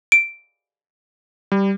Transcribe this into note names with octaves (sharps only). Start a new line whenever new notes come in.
D7
G3